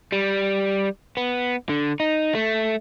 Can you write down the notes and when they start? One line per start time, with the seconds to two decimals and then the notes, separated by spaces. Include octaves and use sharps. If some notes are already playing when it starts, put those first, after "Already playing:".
0.12 G3
1.17 B3
1.69 D3
2.00 D#4
2.35 A3